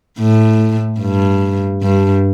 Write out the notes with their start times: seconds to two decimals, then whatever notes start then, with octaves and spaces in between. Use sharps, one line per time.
0.19 A2
1.01 G2
1.82 G2